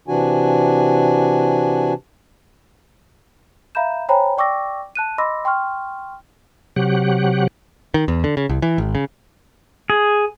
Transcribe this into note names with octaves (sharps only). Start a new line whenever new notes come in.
C3 E3 D4 F#4 G#5
E5 F5 A#5 B5 G6 E7
C5 C#5 G5 G#5 A#5 B5
D5 G5 C#6 D6 E6 A#6
A5 F#6 D#7
D#5 B5 C6 D6 E6 A#6
G5 C6 C#6 F6
C3 F#3 G4 F#5
D#3
E2
D3
C#3
C2
E3
G#1
C#3
G#4